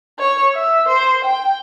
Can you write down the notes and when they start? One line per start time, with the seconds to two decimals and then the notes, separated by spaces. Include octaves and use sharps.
0.19 C#5
0.55 E5
0.88 C5
1.25 G5